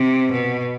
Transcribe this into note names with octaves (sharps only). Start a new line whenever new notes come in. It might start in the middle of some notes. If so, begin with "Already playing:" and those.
Already playing: C3
B2